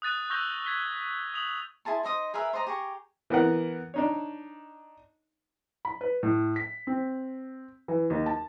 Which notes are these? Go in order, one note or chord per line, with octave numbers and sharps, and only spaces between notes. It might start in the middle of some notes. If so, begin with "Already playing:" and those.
D#6 F#6 A6 D#7
C#6 E6 G6 A#6 F7 G7
G#6 B6 G7
D#6 F7 F#7
E4 G#4 A5 C6
D#4 C5 D#5 D#6
G#4 A#4 B4 E5
C5 D5 D#5 A#5
G4 G#4 A#5 C#6
E3 B3 A#4 F#5
D4 D#4 C#5
B5
B4
A2
B6
C4
E3
D#2
A5